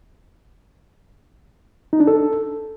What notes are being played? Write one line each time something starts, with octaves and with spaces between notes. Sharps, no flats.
D#4
D4
A4